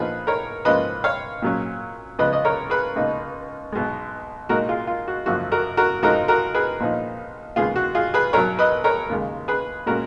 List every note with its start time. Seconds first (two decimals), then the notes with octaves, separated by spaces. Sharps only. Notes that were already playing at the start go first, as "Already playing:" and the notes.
Already playing: A#1 A#2 F3 B3 D#4 G#4 B4
0.27 A#4 C#5
0.65 G#2 F3 A#3 C#4 B4 D#5
1.04 C#5 F5
1.42 A#2 F#3 C#4
2.19 C#2 C#3 F3 B3 B4 D#5
2.33 D#5
2.45 A#4 C#5
2.70 G#4 B4
2.96 C#2 B2 A#3 D#4
3.72 B1 B2 G#3
4.49 A#2 G#3 D#4 F#4 A#4
4.69 F4 G#4
4.87 F4
5.08 F#4
5.26 G#1 F#2 C#3 F3 A#3 F#4
5.52 F#4 A#4
5.77 F#4 A#4
6.03 F2 F3 G#3 D#4 F#4 A#4
6.28 F#4 A#4
6.54 G#4 B4
6.80 A#1 A#2 F3 B3 D#4
7.56 D#2 C#3 G#3 B3 F4 G#4
7.76 F#4
7.95 F4 G#4
8.14 G#4 B4
8.33 B1 B2 F#3 A#4 C#5
8.59 B4 D#5
8.84 A#4 C#5
9.10 D#2 C#3 G#3
9.48 G#4 B4
9.86 A#2 G#3 C#4 F#4 A#4